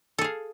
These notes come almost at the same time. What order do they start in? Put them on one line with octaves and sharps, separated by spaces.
A4 G#4 F5